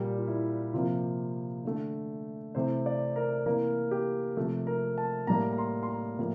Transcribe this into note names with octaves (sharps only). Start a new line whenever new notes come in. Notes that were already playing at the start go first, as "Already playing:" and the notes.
Already playing: A#2 G3 A#3 G4
F4
E4
C3 F3 A#3 F4
D3 A3
C3 E3 A3 C5
D5
A#4
C3 E3 A#3 A#4
G4
C3 F3 A3 A4
A#4
A5
A2 G3 A#3 A#5
A#5
C6
C6
A#5
A2 F3 A#3